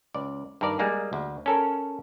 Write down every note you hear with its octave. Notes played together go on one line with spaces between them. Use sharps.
C#2 D5
G2 D#3 A#4 D5
G3 G#3 A#3 G#4
D2
C#4 A4 A#4